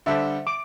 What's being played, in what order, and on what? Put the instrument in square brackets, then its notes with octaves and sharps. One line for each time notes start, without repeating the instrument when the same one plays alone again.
[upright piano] D3 G3 D4 A4 C5 [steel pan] E5
[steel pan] D6